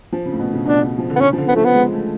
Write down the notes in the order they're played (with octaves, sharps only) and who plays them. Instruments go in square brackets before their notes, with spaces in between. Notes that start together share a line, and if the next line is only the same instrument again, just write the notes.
[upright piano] F3
C#3
A2
B2
C#3
[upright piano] B2 [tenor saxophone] D4
[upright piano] C#3
F3
D3
[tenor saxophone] B3
[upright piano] C#3 [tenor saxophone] C#4
[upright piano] F3
D3
[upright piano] D3 [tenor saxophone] B3
[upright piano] F3 [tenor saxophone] A3
[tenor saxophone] B3
[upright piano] G#3
A3